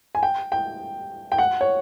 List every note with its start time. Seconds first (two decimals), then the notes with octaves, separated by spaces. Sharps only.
0.15 G#5
0.23 G5
0.52 G5
1.32 G5
1.38 F#5
1.61 C#5